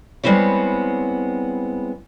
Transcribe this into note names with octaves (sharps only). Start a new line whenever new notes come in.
G3 G#3 B3 C4 E4 C#5